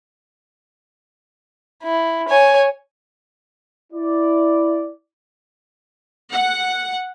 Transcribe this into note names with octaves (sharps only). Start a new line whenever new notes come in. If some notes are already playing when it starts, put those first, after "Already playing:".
E4
C#5 G#5
E4 D5
F#5